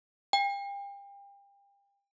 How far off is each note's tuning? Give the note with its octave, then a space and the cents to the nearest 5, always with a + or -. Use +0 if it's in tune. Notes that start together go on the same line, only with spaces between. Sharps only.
G5 +35